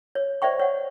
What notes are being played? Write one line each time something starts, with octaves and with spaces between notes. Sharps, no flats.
C#5
C5 D5 E5 G5 C#6
C#5 F#5